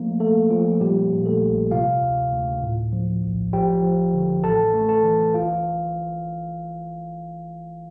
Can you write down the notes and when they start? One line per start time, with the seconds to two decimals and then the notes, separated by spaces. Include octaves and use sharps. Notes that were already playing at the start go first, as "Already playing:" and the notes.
Already playing: F3 A3 A#3
0.20 A3 A#3 A4
0.50 F3 F4
0.81 A#2 G3 G4
1.11 A#2
1.26 A3 A4
1.42 A#1
1.71 C3 F4 F5
2.02 D2
2.32 D2
2.62 A2
2.93 F3
3.23 A#1
3.53 F3 G4 G5
3.83 F3
4.14 D3
4.44 A1 A4 A5
4.74 A3
4.89 A4 A5
5.04 E3
5.34 G1 F4 F5